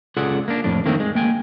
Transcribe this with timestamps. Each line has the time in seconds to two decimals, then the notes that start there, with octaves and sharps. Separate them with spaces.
0.17 C#2 F4 G#4 A4 D5 F#5
0.48 A#3 D4
0.64 F2 A2 D4
0.86 D#3 A3 A#3 C4
1.00 G#3
1.15 A#3 G5 G#5